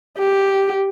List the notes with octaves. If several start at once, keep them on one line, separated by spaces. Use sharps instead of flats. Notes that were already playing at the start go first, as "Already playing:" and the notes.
G4